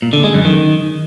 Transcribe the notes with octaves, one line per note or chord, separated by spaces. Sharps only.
A#2
D3
G#3
F#2
D#3